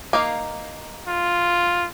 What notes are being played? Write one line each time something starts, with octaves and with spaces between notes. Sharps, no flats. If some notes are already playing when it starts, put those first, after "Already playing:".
A#3 D#4 F5
F4